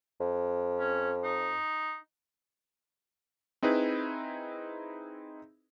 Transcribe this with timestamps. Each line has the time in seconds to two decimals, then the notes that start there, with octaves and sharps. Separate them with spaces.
0.21 F2
0.80 C#4
1.24 D#4
3.63 C4 D#4 E4 G#4 B4